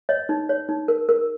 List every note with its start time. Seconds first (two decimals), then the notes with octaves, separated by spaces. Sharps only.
0.09 C#5 D#5
0.29 D#4
0.49 C#5
0.69 D#4
0.88 A#4
1.09 A#4